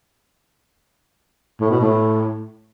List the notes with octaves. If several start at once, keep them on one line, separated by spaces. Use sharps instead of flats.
A2
B2
A2